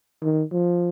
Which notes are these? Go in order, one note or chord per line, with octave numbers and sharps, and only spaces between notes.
D#3
F3